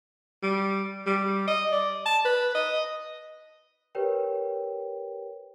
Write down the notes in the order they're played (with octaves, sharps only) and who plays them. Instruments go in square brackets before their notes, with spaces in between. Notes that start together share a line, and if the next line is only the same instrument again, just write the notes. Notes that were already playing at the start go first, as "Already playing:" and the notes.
[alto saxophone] G3
G3
D#5
D5
A5
B4
D#5
[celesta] G4 A#4 B4 C#5 G5